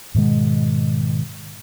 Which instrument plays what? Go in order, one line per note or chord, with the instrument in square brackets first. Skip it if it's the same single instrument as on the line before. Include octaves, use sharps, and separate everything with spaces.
[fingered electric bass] G#2 B2 D#3 G#3